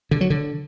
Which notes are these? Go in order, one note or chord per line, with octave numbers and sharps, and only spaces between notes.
D3
F#3
D3